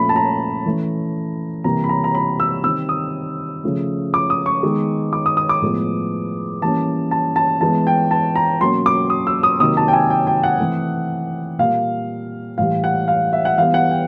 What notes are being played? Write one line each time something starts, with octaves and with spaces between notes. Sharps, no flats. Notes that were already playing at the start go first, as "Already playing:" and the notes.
Already playing: A#2 F3 A3 C#4 B5
A5
A#5
E3 A3 C#4
C3 E3 G3 A#3 A#5
B5
A#5
A#5
B5
E6
D#3 G3 C4 E6
D#6
C#3 F3 A3
D6
D#6
C#6
D#3 G#3 B3
D6
D#6
D#6
D6
A2 F3 G#3 B3
E3 G3 A#3 C#4 A5
A5
A5
E3 G#3 B3 A5
G5
A5
A#5
B2 F#3 A#3 C#4 C6
D6
D#6
E6
D#6
C3 D#3 F#3 A#3 D#6
A5
G5
G#5
G5
G5
F#5
E3 A3 C4
A#2 G3 A#3 F5
A2 E3 G3 F5
F#5
F5
E5
F#5
E3 G3 B3 F5
F#5
G5